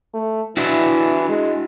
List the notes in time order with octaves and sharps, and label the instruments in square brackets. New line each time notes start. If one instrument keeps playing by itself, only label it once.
[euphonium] A3
[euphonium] E3 [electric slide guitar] D4 E4 F#4
[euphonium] G#3